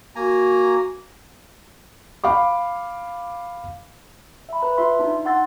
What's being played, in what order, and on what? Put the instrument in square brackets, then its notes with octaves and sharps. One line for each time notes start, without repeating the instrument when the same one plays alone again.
[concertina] A#3 G#5 A#5 [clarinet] F#4
[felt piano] F5 B5 D6
[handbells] E5 B5
B4 A#5
F4 E5 C6
D4 D#4
F#5 C6 E6 A6